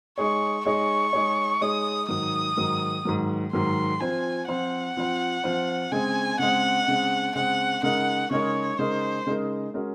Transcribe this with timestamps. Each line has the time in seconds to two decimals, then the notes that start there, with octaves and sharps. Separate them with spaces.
0.18 G#3 D#4 G#4 C#5 C#6
0.65 G#3 D#4 G#4 C#5 C#6
1.13 G#3 D#4 G#4 C#5
1.61 G#3 D#4 G#4 C#5 D#6
2.09 G#2 D#3 F#3 D#6
2.57 G#2 D#3 F#3
3.05 G#2 D#3 F#3
3.53 G#2 D#3 F#3 C6
4.01 F3 C4 F4 C5 G#5
4.48 F3 C4 F4 C5 F#5
4.97 F3 C4 F4 C5
5.44 F3 C4 F4 C5
5.92 C#3 G#3 C4 G#5
6.39 C#3 G#3 C4 F#5
6.88 C#3 G#3 C4
7.35 C#3 G#3 C4 F#5
7.83 C#3 G#3 D#4 A#4 F#5
8.31 C#3 G#3 D#4 A#4 C#5
8.79 C#3 G#3 D#4 A#4 C5
9.27 C#3 G#3 D#4 A#4
9.74 G#3 C#4 F#4 A#4